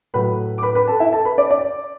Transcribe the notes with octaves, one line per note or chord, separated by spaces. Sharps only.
A2 F#3 A3 B4 B5
D6
B4 B5
B4 B5
A4 A5
E4 E5
A4 A5
B4 B5
D5 D6
D5 D6